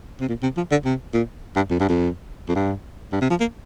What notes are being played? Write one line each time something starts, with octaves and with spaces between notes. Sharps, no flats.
C3
A#2
C3
F3
D3
C3
A#2
G2
F2
G2
F2
F2
G2
G2
C3
F3
A#3